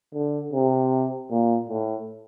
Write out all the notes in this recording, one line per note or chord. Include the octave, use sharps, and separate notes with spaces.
D3
C3
A#2
A2